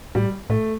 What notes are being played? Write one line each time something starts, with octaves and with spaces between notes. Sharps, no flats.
A2 G3
A2 A3